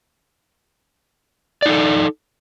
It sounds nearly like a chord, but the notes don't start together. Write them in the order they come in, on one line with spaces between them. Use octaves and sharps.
D5 D#4 A4